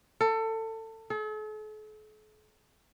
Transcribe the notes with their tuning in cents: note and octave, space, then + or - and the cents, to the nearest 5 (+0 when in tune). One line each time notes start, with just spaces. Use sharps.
A4 +25
A4 -45